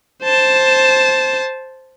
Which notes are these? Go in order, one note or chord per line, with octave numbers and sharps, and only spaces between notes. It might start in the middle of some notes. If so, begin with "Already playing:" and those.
C5 A5